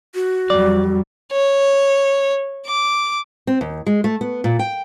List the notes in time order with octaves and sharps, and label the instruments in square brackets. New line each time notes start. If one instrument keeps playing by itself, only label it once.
[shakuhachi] F#4
[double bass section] F2 F#3 G3 [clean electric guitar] D5
[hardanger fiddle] C#5
D6
[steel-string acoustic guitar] C4
D#2
G#3
A3
B3
A#2
G5